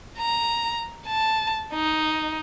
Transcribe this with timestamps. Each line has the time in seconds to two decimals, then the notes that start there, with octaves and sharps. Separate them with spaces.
0.19 A#5
1.07 A5
1.73 D#4